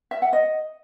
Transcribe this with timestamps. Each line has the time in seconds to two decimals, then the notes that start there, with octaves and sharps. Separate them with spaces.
0.11 E5
0.22 F#5
0.33 D#5